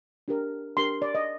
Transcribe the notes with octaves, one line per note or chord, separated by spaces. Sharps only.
D4 G4 A#4
D4 G4 A#4 C6
D5
D#5